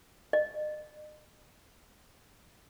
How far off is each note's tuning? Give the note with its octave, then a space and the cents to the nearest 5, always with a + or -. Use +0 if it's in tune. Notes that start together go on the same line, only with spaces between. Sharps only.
D#5 -45